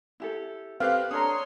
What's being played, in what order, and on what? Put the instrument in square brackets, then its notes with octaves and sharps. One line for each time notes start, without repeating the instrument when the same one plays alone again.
[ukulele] E4 G4 A4
[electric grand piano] C4 G4 F#6 [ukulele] A4 B4 [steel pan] F5
[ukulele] D4 A4 A#5 [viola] C#5 C6 [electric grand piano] D#6